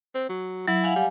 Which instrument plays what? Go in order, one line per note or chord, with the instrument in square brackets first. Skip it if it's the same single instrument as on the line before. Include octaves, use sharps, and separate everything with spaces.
[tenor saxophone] C4
F#3
[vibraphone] F#3 [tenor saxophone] E4
[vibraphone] F5 F#5 G#5
[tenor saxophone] G3